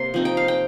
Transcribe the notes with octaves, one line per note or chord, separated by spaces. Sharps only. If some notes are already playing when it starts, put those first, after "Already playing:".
Already playing: C3 A#3 C6
F3 C4 D#4
G5
F5
G5